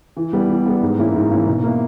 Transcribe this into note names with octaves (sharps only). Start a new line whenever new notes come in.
E3
G3 B3
E3
G3 B3
G#2
E3 A#3 C#4 E4
G#2
E3 A#3 C#4 E4
B2
A#3 E4